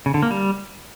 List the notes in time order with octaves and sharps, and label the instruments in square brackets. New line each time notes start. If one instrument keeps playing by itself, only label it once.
[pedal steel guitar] C#3
D3
A#3
G3